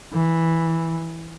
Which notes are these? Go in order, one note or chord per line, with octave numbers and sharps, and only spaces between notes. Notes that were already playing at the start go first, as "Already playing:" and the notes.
E3